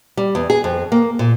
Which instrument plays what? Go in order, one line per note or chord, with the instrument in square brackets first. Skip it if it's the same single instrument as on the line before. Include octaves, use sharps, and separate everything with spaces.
[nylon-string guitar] G3
E2
G#4
F2
A#3
A#2